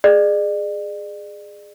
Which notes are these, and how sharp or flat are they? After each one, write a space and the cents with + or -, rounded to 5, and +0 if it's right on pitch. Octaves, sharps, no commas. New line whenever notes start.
G#4 +0 D5 +35